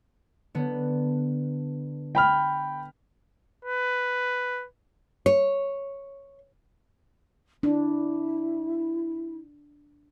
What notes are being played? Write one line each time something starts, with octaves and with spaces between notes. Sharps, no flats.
D3 B3
G5 B5 F6
B4
C#5
D4 E4